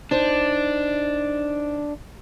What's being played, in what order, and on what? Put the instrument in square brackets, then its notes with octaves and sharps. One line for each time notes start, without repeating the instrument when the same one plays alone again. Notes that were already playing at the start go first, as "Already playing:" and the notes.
[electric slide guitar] D4 [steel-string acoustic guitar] D#4 C5